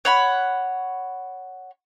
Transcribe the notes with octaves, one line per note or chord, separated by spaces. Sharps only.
C#5 F#5 B5